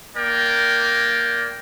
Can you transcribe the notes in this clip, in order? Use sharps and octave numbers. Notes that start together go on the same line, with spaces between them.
A#3 A#4 D5 G5